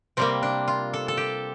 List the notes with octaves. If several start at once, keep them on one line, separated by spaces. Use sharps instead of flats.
C3 G3 A#3 C4
D4
F4
A4
A4
G4